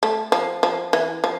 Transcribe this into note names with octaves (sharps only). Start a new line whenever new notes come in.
A3
F3
F3
E3
F3